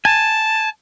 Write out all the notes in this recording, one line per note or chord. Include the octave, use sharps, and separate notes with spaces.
G#5 A5